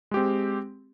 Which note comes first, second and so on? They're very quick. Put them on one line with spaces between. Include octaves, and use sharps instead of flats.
G#3 G4 C4